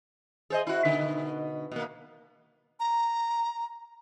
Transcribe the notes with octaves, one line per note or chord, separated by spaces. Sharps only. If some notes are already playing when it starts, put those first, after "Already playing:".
G#4 C5 D#5
E4 F#4
B2 D3 D#4
B2 A#3
A#5